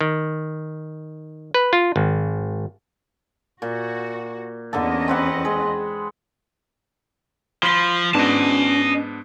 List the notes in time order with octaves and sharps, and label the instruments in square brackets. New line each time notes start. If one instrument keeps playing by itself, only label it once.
[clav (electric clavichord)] D#3
B4
F4
G#1
[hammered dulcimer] A#2 [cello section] F#4
[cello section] E2 C#4 D#5 [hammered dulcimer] D3 A#3 A4
[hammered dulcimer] C4 B4 F#5
G#3
[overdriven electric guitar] F3 [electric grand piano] B5 B6
[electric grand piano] G#2 B3 D4 [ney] C#4 [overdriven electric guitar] D#5 A5